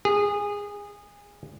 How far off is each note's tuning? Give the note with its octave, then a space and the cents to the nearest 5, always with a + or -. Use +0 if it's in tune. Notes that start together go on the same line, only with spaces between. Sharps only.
G#4 -20